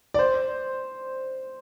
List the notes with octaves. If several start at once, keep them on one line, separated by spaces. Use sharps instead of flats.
D5
C5